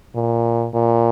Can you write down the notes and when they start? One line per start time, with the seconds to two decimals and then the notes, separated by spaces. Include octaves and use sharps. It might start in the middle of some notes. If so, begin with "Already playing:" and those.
0.15 A#2
0.74 A#2